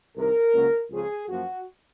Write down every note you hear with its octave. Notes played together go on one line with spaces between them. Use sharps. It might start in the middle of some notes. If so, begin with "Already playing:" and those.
C2 C3 D#3 A#4
C#2 C#3 F#3 A#3
C#2 C#3 F3 C4 G#4
F#2 F3 A#3 F#4